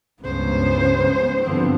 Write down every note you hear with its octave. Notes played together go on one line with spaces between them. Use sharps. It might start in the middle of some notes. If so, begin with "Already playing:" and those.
C#2 G2 C#3 B3 C5
G2 D3 F3 B3 C4